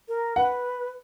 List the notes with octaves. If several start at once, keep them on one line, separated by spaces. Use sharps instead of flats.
A#4
B4 F#5